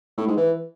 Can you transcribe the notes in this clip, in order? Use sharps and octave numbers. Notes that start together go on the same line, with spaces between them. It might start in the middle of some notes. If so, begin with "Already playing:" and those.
A2
G#2
E3